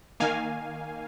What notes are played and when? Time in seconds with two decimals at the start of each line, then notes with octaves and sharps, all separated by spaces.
0.20 D#3 A#3 F5 G#5